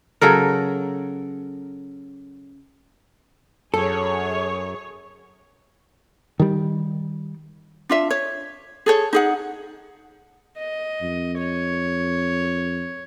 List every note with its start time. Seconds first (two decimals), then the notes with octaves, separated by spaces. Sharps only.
0.21 C#3 F#3 A4 A#4
3.74 F#2 G#4 A4 C#5
6.40 D#3 G3
7.89 D4 F4 E5
8.10 C#5
8.86 G#4 A4 C#5
9.13 D#4 G#4 F#5
10.57 D#5
11.02 F2
11.37 C#5